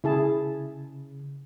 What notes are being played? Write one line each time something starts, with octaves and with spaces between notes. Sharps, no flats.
C#3 E4 G#4 A5